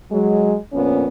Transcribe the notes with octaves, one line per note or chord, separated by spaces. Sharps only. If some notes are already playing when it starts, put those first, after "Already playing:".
F#3 G#3
F2 A#2 B3 C#4